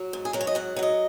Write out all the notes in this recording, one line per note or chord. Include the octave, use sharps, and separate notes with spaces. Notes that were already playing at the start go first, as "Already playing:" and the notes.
Already playing: F#3
G#2
G#4
F#3 A#4
C#5
D#5
G#2 F#5
F#3 F#5
D#5